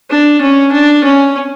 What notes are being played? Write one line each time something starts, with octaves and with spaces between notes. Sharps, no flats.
D4
C#4
D4
C#4